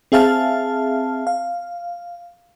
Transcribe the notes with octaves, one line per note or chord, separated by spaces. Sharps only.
C4 G#4 E5 F5 A5 F6
F5